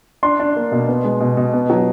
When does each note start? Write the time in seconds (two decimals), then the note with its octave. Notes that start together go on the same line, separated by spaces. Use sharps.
0.23 D4 C6
0.40 D4
0.56 A#3
0.72 B2
0.88 B3
1.04 G#3
1.20 B2
1.37 B2
1.53 B3
1.70 F#3